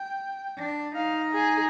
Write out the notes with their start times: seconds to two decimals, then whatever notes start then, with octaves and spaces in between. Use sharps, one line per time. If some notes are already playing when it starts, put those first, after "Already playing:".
Already playing: G5
0.58 D4
0.95 D#4 F5
1.33 G#4